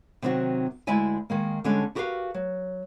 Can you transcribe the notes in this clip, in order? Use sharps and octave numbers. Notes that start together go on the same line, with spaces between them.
C3 D#3 F#3 C4 D#4 F#4
D2 G#3 E4 D5 E5 G#5
D#3 G#3 A#3
D3 G3 G#3 C#4 D4 A4
E4 F#4 G4 A#4 B4 F5
F#3